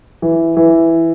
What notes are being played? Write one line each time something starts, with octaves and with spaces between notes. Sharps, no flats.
E3
E3